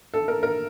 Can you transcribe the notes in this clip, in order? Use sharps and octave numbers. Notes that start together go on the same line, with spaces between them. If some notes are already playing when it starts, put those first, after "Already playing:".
A4
A#4
A#4